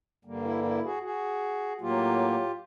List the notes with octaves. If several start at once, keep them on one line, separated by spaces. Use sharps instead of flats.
G2 D3 G3 A#3
E4
E4
F#4 G#4
F#4 G#4
A2 F#3 A#3 F4 G4